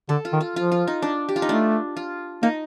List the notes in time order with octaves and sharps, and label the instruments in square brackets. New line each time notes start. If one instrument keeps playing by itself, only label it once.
[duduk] D3 [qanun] A4
[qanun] F4
[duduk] D#3
[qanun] F4
[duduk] F3 [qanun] F4
[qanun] F4
D#4
D4
G4
F4
D#4
[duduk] A3 [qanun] D4
[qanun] F4
[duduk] A#3 [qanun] D#4